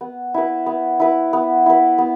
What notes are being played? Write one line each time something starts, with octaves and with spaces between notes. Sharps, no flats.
B3
E4 B4
B3
E4 B4
B3
E4 B4
B3